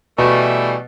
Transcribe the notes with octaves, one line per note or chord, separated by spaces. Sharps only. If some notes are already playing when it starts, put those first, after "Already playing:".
B2 E3 G3 A3